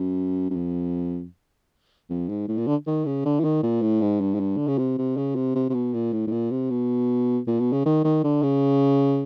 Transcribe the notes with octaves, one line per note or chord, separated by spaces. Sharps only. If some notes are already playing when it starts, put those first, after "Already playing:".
Already playing: F#2
F#2
F2
F2
G#2
A2
A#2
D3
D#3
C#3
D3
E3
D#3
A#2
A2
G#2
G2
G#2
G2
D3
C#3
C3
C3
C#3
C3
C3
C3
B2
A#2
A2
A2
A#2
C3
B2
A#2
B2
C#3
D#3
D#3
D3
C#3